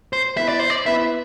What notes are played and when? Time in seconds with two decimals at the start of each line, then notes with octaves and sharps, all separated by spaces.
0.13 C5
0.37 B3 E4 B4 E5
0.48 D5
0.59 C5
0.70 D5
0.86 B3 E4 B4 E5